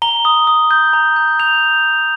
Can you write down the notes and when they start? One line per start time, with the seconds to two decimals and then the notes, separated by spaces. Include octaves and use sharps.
0.02 A#5 G7
0.25 D#6
0.47 D#6
0.71 G6
0.93 A#5
1.16 G6
1.39 G6 F7